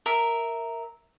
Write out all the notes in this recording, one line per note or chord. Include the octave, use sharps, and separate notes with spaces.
A#4 E5